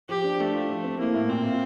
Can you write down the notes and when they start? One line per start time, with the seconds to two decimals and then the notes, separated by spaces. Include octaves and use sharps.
0.09 F3 G4
0.24 D4
0.39 A3 D4
0.54 F4
0.69 F3
0.84 C4
0.99 A#3 E4
1.14 A2
1.29 A#2 C4
1.44 F4